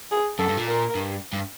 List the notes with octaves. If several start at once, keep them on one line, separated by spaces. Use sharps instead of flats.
G#4
F#2 A4
G2
A#2
A#4
G2
G2